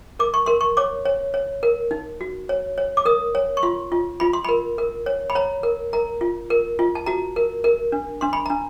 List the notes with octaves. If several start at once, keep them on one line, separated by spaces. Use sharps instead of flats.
A#4 D6
C#6
A#4 C6
C#6
C#5 D6
C#5
C#5
A#4
D#4
F#4
C#5
C#5
D6
A#4 D#6
C#5
C#6
F4 C6
F4
F4 B5
C6
A#4 B5
A#4
C#5
B5
C#5 A#5
A#4
A#4 A#5
F4
A#4
F4
A5
F#4 A#5
A#4
A#4
D4
D4 C6
B5
D4 A#5